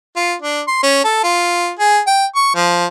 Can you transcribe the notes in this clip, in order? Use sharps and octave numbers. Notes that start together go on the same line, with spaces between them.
F4
D4
C6
C#4
A4
F4
G#4
G5
C#6
F3